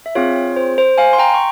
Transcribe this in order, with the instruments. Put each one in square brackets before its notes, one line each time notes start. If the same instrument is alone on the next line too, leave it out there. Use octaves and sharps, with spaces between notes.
[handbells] E5
C4 F4 G#4 C#5 F5
C#5
C5
C5
F5 G#5
C6
G5 A#5
C#6